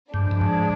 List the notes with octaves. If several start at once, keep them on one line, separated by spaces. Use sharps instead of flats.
G2 F3 G#3 D4
G2
G#2